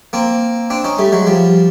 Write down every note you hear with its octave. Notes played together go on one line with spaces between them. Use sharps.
A#3 C4
C4 D4
C#4 D#4
G3 A3
F#3 G#3
F3 G3